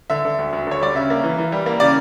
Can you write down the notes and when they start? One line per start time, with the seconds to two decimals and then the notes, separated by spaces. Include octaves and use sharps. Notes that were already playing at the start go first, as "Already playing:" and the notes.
0.10 D3 E5
0.25 D3
0.39 D2
0.53 D2
0.67 D3 C#5
0.81 G3 D5
0.95 C#3 E5
1.10 A#3
1.24 E3
1.38 E3
1.52 G3
1.66 A#3
1.80 C#3 D5